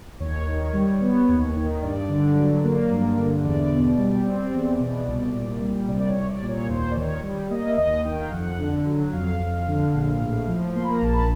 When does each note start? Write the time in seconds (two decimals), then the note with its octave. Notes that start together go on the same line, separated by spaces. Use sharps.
0.20 D#2 C#5
0.47 D#3
0.73 G3
1.01 B3
1.28 D#2
1.56 D#3
1.81 G2 D5
2.09 D3
2.35 F#3
2.64 A#3
2.91 G2
3.17 D3
3.44 E2 D5
3.72 B2
3.98 G3
4.25 C4
4.53 E2
4.79 B2
5.07 C2
5.34 A#2
5.61 G3
5.87 C2 D5
6.00 D5
6.09 C#5
6.15 C2
6.29 D5
6.42 A#2
6.49 C#5
6.69 D#2 C5
6.91 D5
6.96 D#3 C#5
7.23 G3
7.50 A#3 D#5
7.68 E5
7.77 D#2 D#5
8.04 D#3 G5
8.20 F5
8.31 F2 F#5
8.59 D3
8.85 F#3
9.12 F2 F5
9.39 F2
9.67 D3
9.94 A#1
10.21 A2
10.47 F3
10.75 A#3 C6
10.84 B5
10.93 A#5
11.01 A#1 A5
11.13 B5